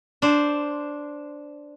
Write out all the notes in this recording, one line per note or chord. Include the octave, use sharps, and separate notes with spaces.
D4 C5